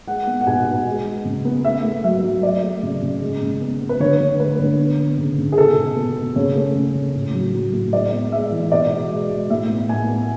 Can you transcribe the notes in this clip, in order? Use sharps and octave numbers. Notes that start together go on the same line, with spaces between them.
G#3 F#5
B3
F#5
B2 G#5
B2
G#3
G#3
C#3
B3
A3 E5
A3
F#3 E5
F#3
F#3 D5
A3
C#3
C#3
G#3
C#3
B3
B3
B4
D3 C#5
D3
A3 B4
D3
B3
B3
C#3
C#3
G#4
B2 A4
B2
B3
B3
C#3 C#5
A3
C#3
C#3
A2
F#3
F#3
A2
G#3 D5
B3
G#3 E5
E3
B2 D5
G#3
G#3
G#3
A2 E5
B3
A2 G#5
B3